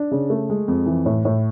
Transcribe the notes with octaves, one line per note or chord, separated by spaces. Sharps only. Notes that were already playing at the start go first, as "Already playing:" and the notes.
Already playing: D4
C#3
A3
G#3
F2
E3
A2
A2